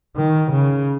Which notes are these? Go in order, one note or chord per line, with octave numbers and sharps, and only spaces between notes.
D#3
C#3